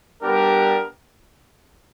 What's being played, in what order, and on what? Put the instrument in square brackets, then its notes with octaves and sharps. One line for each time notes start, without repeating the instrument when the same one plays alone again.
[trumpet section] G3 B3 D4 G4 A#4